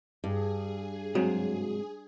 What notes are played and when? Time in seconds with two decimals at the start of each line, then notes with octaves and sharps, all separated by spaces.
0.24 G2 G#4
1.15 G#2 C3 F#3